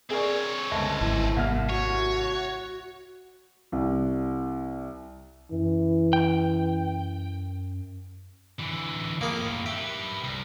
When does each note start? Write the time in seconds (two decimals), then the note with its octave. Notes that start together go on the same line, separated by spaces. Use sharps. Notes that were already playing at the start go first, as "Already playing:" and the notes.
0.11 C4 G#4 A#4 C#5 D5
0.71 G1 C#2 A5
1.01 G#1 E4
1.37 C2 A#3 F6
1.69 F#4 C#5
3.72 C2
5.51 F#2 E3
6.13 G5
8.60 D3 E3
9.21 F2 A2 A#3 G#4 F5
9.66 G4 B4 E5
10.24 C2